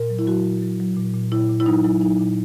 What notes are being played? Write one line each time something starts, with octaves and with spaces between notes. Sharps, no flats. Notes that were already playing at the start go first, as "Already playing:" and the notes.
Already playing: A#2 A#4
F#3
E4
F#3 F#4
A#2
F#3
F#3
A#2
A#2
A#2 E4
A#2
E4
F#3 D#4
F#3 E4
F#3 D#4
A#2